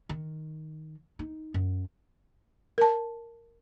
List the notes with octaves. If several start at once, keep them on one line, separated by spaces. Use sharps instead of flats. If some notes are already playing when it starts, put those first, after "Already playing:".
D#3
D#4
F#2
A#4 A5